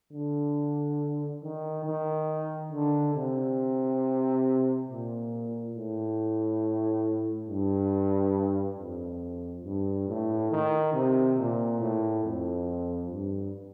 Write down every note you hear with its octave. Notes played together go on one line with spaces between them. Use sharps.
D3
D#3
D#3
D3
C3
A#2
A2
G2
F2
G2
A2
D#3
C3
A#2
A2
F2
G2